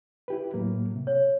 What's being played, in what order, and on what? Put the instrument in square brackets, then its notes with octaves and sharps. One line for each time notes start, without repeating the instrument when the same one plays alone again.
[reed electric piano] E4 G4 B4
A2 F#3 A#3
C3
[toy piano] C#5